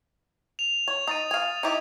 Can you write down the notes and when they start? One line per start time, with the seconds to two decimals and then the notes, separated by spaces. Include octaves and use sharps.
0.59 F7
0.88 C#5
1.07 D#4 D#6 A6 D#7
1.31 F5 G#5
1.63 D#4 E4 G4